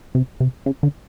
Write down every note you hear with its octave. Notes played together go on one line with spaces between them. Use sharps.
C3
C3
C#3
D3